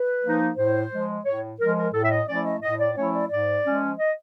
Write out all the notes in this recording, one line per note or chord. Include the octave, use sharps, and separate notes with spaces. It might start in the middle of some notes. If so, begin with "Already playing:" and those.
Already playing: B4
F3 A#3 D#4
A2 C5
F3 G#3
A2 C#5
F3 G#3 A#4
A#4
A2 A4
E5
D#5
F3 A3 C#4 E4 D5
D#5
A2 D#5
D5
F3 A3 C#4 E4 C#5
D5
G#2 D5
F3 G#3 C#4
D#5